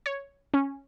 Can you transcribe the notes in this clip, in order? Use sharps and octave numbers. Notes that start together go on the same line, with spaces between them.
C#5
C#4